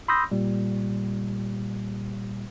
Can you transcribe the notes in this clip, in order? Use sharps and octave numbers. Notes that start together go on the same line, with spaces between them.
B5 C6 D#6 E6 G6 A#6
A#2 G3